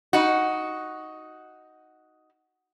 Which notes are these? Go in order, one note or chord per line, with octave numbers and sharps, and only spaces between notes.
D#4 F#4